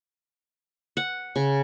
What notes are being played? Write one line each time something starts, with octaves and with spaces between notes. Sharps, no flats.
F#5
C#3